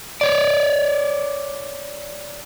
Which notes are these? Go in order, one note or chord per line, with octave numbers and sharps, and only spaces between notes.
C#5 D5